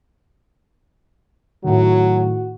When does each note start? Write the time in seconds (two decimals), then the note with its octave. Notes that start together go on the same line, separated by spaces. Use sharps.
1.64 A2 D#3 F#3 F#4